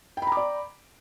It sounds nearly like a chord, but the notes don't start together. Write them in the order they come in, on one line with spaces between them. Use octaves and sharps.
G5 B5 A#5 D6 D5